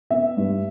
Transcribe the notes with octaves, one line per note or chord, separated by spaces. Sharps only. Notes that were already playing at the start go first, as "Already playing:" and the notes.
B3 E5
G2